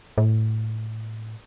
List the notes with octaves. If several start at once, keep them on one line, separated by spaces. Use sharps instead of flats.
A2